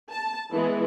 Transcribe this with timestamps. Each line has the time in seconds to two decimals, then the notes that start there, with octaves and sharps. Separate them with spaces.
0.11 A5
0.53 E3 G#3 B3